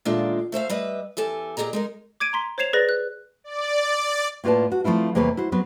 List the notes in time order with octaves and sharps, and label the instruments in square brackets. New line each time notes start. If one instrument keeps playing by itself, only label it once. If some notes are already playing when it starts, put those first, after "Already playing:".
[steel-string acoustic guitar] A#2 D#3 G#3 A3 D4 F4
A3 C5 E5 F5
G3 B4 D#5 E5
E2 G4 A4 G#5
A#2 G4 G#4 D#5 A#5
G#3 D#4 A#4
[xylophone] D6 G#6 D7 D#7
A#5 C6 B6
C5 C#5 G#6 C7 E7 F7
G#4 B4 D5 A6 A#6
F#6
[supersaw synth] D5
[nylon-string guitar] A2 A#3 F4 B4 D5 A5
F#4
F3 A3 C4 E4 F4
E2 C3 A#3 A4 B4 C#5
E4 F#4 C5
F#3 B3 C4 B4